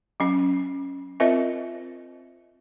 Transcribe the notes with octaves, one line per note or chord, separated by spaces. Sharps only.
F#3 C#4
C4 F4 A#4 C5 D#5 E5